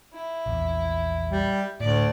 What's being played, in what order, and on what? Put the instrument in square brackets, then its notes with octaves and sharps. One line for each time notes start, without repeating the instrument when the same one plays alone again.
[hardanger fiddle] E4
[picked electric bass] A#1 E2
[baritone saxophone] G3
[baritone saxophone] D2 [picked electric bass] A2 [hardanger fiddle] D5